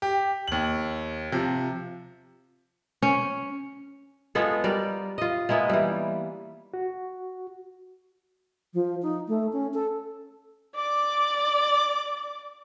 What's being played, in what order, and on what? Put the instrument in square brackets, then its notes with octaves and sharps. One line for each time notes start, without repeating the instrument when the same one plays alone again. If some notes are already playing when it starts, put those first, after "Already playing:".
[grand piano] G4
D#2 F#7
C3 F3
[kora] C#4
G#3 B3 F4 A4
G3 A#4 D5
F4 D#5
G#3 A#3 B3 E4
E3 G3
[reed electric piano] F#4
[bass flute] F3
D#4
A3
C#4
A4
[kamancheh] D5 D6